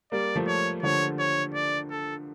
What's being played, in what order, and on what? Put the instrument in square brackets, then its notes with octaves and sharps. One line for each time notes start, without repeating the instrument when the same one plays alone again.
[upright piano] G3 A#3 [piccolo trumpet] D5
[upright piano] F3 A3
[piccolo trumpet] C#5
[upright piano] D3 F3 [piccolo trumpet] C#5
[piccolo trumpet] C#5
D5
A4